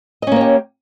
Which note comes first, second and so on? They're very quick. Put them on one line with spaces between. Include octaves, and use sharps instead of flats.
D#5 C#4 A#3 C#5 G4